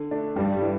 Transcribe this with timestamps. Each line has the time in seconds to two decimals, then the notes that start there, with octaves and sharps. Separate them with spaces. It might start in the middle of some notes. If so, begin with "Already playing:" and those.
Already playing: D3
0.11 A3 D4
0.36 G2 G3
0.62 E3